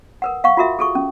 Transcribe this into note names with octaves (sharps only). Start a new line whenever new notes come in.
A#4 B4 F#5
F5 F#5 C#6
F4 F#4 A#4 E5
G#4 A4 C#6
C#4